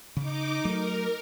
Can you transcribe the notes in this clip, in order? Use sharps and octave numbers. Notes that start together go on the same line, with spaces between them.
C#3 D#4 D6
F#3 A3 A#4